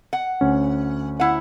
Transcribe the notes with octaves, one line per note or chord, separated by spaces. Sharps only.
F#5
D2 C#4
E4 F#5